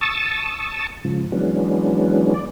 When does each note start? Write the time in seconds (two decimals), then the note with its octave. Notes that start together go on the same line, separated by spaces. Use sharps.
0.01 A5 C#6 D#6 E6 A6
1.05 G#2 C#3 F3
1.32 E3 F#3 G#3 B3 C#4 D4
2.34 D5